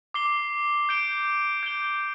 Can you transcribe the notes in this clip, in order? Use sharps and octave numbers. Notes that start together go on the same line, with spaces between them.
D6 C7 G7
G6 D7 G7
G6 D7 G7